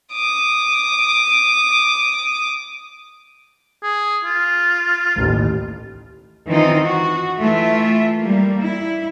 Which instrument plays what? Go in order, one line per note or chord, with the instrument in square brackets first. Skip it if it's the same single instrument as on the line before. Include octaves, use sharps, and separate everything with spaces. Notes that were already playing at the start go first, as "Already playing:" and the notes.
[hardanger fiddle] D6 D#6
[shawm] G#4
F4
[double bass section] A1 D#2
[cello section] D#3 E3 C4 D#4 F4
F#4
E3 A3 F4 E5
G3 A#3
E4